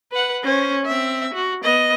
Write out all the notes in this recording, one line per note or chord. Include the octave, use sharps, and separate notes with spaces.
B4 F#5
C#4 C5
C4 E5
F#4
B3 D#5